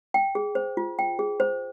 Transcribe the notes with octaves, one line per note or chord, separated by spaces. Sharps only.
G5
G#4
C5
F4
G5
G#4
C5